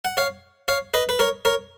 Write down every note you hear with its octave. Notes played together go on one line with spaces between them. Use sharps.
F#5
C#5 F5
C#5 F5
B4 D#5
B4
A#4 C#5
A#4 C#5